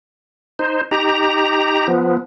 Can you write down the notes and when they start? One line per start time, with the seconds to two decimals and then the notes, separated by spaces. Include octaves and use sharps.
0.59 D#4 C5
0.91 D#4 G4 A#5
1.88 F3 B3